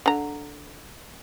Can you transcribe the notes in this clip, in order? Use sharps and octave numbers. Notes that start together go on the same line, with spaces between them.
D3 A#5